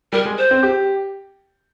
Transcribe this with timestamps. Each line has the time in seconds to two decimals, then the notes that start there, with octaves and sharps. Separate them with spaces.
0.12 G3 A#4
0.25 G#3
0.38 C5
0.51 C4
0.63 G4